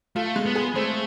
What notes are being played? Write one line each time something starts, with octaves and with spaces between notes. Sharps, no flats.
A3 F4
G#3
B3
G#4
A3 C4